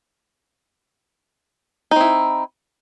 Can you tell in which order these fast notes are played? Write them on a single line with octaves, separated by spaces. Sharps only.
D#4 C4 E4